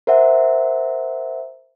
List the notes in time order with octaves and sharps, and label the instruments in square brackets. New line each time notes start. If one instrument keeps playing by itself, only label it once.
[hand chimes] A#4 C5 E5 F#5